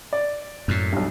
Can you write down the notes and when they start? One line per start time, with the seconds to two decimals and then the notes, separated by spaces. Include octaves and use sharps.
0.13 D5
0.68 F#2 A2
0.93 B1 G2